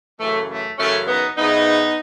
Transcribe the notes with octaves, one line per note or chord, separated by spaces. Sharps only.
F#2 C#3 E3 A3
A3
F#2 C#3 E3 A3 C#4
B3 D#4
G#2 E3 B3 D#4